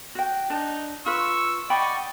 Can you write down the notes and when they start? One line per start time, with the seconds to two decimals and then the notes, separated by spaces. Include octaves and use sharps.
0.15 F#4 G5
0.50 D4 D#4 A5
1.06 F4 B4 C#6 E6
1.70 D5 D#5 F#5 G5 B5 C#6